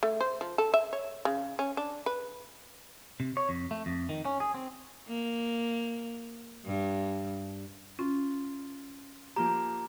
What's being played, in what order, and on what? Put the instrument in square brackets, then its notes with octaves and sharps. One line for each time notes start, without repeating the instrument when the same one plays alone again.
[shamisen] A3
C5
F3
A4
E5
C#5
C#3
C#4
D4
B4
[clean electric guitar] C3
C#5
F2
A3
F2
D#3
C#4
G#4
C4
[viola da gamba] A#3
G2
[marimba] C#4 [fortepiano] F4
[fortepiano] F3 A#3 G4 [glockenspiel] A#5